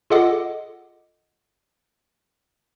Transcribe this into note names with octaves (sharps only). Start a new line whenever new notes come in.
F4 G#4 A4 D#5 F#5 D6